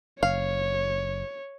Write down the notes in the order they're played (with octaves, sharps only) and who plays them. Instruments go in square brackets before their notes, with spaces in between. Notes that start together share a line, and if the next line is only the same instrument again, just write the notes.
[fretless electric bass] F#1 [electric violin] C#5 [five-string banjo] F5